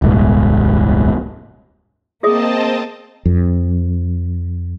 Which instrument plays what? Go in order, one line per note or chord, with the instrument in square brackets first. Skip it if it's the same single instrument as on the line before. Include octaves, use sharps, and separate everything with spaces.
[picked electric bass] D#1 C2 G#2
[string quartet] A#3 [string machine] C4 D#5 A5 [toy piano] G#4 E5 D#6
[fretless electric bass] F2